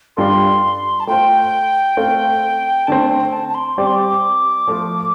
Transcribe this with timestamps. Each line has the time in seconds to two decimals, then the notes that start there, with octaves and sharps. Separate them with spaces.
0.17 G2 G3 F4 A4 C6
1.00 A5
1.07 A3 F4 C5 G5
1.97 A3 C4 A4 F5
2.87 D3 A3 C4 A5
3.10 G5
3.32 A5
3.48 A5
3.54 C6
3.77 G3 C4 G4 D5 D6
3.86 C6
3.96 D6
4.67 F3 A3 F4